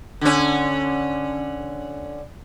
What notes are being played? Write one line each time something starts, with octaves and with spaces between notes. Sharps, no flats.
D3 C#4